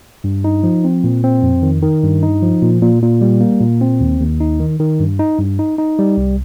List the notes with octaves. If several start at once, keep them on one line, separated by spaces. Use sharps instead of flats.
G2
D#4
F3
C4
A#2
C4
F2
D#3
D#3
G2
D#4
F3
A#2
A#2
A#2
G3
A#3
A#2
C4
D#2
D#2
D#4
D#3
D#3
G2
D#4
G2
D#4
D#4
G3
C2